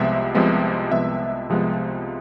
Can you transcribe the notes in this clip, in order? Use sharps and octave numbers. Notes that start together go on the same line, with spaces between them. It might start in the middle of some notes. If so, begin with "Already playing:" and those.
Already playing: C2 C3 F3 G#3 B3 E5
C2 C3 F3 G#3 B3
C2 C3 F3 G#3 B3 E5
C2 C3 F3 G#3 B3